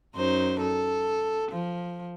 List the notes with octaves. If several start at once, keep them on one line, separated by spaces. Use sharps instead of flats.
F#2 D#4 C5
A4
F3